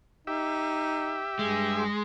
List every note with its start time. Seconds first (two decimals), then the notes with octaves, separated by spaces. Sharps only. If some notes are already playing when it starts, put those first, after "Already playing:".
0.27 D#4 G4 E5
1.39 G2 G#3